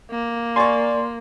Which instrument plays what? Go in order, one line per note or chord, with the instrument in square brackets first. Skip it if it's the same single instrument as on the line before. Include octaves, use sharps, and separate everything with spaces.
[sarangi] A#3
[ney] D5 [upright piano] G#5 A#5 C#6 [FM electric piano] C6 A6